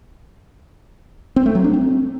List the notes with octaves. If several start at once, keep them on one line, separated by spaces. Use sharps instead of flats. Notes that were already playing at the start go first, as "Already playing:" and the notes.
C4
A3
F#3
D4
C4